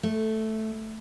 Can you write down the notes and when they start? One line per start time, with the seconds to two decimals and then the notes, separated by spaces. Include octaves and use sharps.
0.03 A3